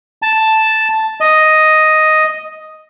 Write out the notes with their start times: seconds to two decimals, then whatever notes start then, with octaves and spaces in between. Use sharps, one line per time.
0.22 A5
1.20 D#5